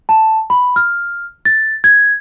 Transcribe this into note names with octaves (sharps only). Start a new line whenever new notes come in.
A5
B5
F6
A6
G#6